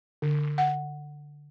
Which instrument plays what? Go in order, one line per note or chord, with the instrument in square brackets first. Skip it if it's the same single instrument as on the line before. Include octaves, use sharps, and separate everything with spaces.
[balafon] D3
F#5